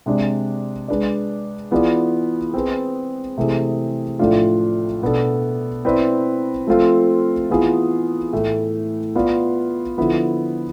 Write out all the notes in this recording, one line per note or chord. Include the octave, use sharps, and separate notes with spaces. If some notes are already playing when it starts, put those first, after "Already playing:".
C3 G#3 D4
G#3 D4 G#4 B4 D5
E3 B3 F4 G#4 D5
C4 G#4 B4
C3 E3 A3 C4 G#4
A2 F3 A3 D4 F4
B2 B3 D4 A4
C4 E4 B4 D5
F3 A3 C4 F4 A4
E3 B3 F4 G#4
A2 E3 A3
B3 F4 B4 D5
D3 F3 B3 E4